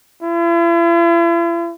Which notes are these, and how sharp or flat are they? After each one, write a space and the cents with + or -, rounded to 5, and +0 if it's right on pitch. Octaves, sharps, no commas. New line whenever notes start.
E4 +45